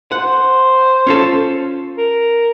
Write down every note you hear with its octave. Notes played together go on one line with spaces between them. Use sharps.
C5 F#5
C#4 F4 A4
A#4